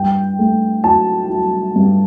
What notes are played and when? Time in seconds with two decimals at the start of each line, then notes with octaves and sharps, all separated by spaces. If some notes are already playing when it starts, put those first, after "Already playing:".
Already playing: G2 G5
0.39 A3
0.84 F#3 A5
1.30 F#3
1.76 G2